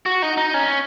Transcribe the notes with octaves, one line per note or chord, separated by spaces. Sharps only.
F#4
D#4
D#4
C#4